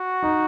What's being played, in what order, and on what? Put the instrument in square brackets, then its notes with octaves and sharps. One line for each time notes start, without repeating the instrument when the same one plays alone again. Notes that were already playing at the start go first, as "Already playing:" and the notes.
Already playing: [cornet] F#4
[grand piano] D#4